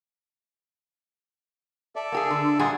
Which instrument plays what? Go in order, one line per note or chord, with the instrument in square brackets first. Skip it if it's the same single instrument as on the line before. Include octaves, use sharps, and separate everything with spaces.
[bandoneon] A4 D5 E5
[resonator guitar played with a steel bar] A#3 G4 G#4
D3
[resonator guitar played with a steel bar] A#2 G3 G#4 [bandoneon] F#5 G#5